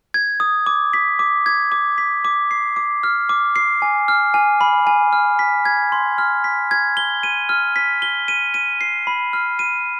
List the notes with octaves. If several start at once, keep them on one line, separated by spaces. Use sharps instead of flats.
G#6
D#6
D6
B6
D6
G#6
D6
B6
D6
C7
D6
F6
D6
C7
G#5
F6
G#5
B5
G#5
F6
B6
G#6
C6
F6
B6
G#6
G7
D#7
F6
B6
G7
D#7
D#7
C7
B5
F6
D#7